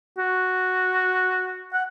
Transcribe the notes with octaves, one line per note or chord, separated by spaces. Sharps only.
F#4
F#5